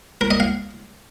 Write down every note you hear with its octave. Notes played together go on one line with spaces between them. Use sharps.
A#4
D#5
F5